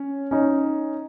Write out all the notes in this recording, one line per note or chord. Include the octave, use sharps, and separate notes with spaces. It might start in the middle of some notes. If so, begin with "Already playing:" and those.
Already playing: C#4
C#4 D#4